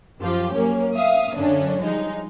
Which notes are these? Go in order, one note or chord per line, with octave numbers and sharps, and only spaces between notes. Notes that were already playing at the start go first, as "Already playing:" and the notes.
F#2 F3 F4 G4
F#3 A#3 C#4
E5 F5 D#6
F#2 D3 C#4 D4
F3 G3 G#3 D#4